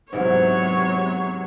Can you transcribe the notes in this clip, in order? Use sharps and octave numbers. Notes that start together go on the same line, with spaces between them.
G#2 C3 E3 F#3 B3 C#5